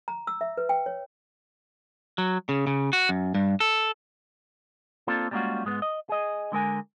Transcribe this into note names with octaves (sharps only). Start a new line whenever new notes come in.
A#5
E6
E5
B4
G5
C#5
F#3
C#3
C#3
F#4
F#2
G2
A4
A#3 C4 D4 F4 A4
G3 G#3 A#3 C#4 F4 F#4
G#2 G#3 B3
D#5
G#4 D#5
D3 G#3 A#4 G#5